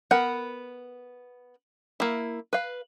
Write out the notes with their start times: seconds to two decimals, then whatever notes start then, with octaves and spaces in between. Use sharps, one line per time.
0.11 B3 A#4 F#5 B5
2.00 A#3 E4
2.53 B4 F5